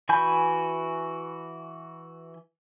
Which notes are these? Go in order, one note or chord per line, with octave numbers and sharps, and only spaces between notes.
E3 F#4 G#5 B5 G6